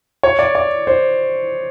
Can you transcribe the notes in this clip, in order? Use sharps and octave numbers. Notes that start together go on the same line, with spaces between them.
C#5
D5
D5
C5